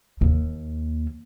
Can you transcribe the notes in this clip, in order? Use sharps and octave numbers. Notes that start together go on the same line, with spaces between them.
D#2 A#3